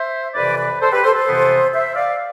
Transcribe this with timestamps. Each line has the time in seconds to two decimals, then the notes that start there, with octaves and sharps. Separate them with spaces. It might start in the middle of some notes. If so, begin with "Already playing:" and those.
Already playing: C5 E5
0.35 F2 C3 E3 B4 D5
0.58 B4 D5
0.81 A4 C5
0.93 G4 B4
1.04 A4 C5
1.15 A4 C5
1.27 F2 C3 E3 B3
1.73 C5 E5
1.96 D5 F5